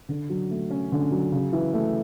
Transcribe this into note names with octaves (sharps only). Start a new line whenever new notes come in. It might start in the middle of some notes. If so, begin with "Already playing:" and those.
D3
F#3
A3
C#4
D3
F#3
C#3
E3
A3